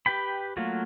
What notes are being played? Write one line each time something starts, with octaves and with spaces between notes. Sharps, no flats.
G4 B4 G5 B5
F#3 A3 A#3 F4 F#4